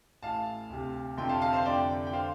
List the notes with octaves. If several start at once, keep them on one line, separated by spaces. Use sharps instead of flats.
A1 A2 F5 A5
D2 C3
F1 F2 D3 G5 C6
F5 A5
F5 A5
C5 F5
F1 F2 D3 D5 G5
G5
D3 C5 F5